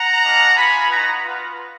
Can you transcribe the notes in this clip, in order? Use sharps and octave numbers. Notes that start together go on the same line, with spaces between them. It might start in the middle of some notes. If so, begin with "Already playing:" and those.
Already playing: F#5 A#5
G#3 D4 F4
B3 F4 G#5 B5
B3 D#4 F#4 F#5 A#5
B3 F4